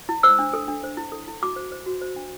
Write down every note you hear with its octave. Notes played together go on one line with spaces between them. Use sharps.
E4
C5 E6
D4
A4
D4
C5
E4
A4
E4
F#4 D6
C5
C5
F#4
C5
D4